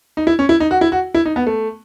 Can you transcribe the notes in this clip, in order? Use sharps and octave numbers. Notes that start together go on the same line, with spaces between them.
D#4
E4
C#4
E4
D#4
F#4
E4
F#4
E4
D#4
B3
A3